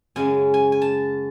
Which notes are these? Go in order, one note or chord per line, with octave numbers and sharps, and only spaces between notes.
F#2 C#3 G#3 G#5
G#5
G#5
A5